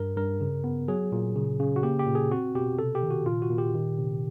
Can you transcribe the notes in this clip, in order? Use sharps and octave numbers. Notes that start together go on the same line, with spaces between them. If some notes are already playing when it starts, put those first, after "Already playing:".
Already playing: G2 A#4
G2 A#4
C#3
B3
F#3 G#4
A#2
C#3
C#3
F#4
A#3 G4
G4
A#2
G#4
C4 F#4
B2 G4
C3 A4
G4
D#3
F#4
A#2 F4
F#4
A#2
G4
D#3
C3